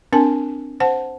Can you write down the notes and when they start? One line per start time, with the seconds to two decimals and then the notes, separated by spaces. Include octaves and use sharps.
0.12 C4 D4 A#4 G#5 A5
0.80 C5 F#5 A5